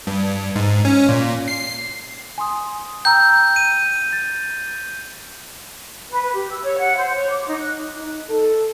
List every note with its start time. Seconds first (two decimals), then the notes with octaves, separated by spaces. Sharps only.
0.07 G2
0.56 G#2
0.85 C#4
1.09 A#2
1.48 C7
2.38 G#5 C6 D#6
3.05 G5 A#5 E6 G6
3.56 D#7
4.13 A6
6.09 B4
6.22 B4
6.34 G4
6.51 E6
6.63 C#5
6.78 F#5
6.97 C5
7.14 C#5
7.30 D6
7.47 D#4
7.59 F#6
7.96 D#4
8.30 A4